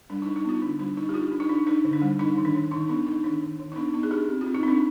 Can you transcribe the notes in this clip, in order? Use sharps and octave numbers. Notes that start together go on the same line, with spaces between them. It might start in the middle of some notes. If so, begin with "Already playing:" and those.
G3 D4
D#4
D4
D#4
B3 F4
D3 D4
G3 D4
D4 D#4
G4
D4 F4
D4
D#4
D4
D4 D#4
D3
D4
G3
D4 D#4
D#3
D4
D#3
D#3 D#4
B3 D4
D4 D#4
D#3 D4
D#3
D#3
D#4
B3 D4
B3 D#4
G#4
D4 G4
C4
F4
C4
D#4
C4 D4